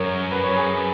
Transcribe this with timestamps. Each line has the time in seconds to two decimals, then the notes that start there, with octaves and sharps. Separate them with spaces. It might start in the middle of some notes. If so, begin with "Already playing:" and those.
Already playing: F#2 A#4 C#5
0.31 B4
0.44 C#5
0.55 G#4 B4